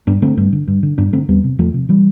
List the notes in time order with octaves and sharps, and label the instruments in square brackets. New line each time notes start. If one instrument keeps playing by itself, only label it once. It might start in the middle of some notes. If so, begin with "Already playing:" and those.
[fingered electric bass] G2 B3 D4
D3 A3 C4
G2
D3
G2
D3
G2 B3 D4
D3 A3 C4
E2 G3 B3
C3
E2 F3 A3
C3
E3 G3